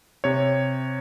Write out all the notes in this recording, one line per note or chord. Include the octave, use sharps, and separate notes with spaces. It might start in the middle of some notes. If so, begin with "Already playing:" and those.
C3 C#5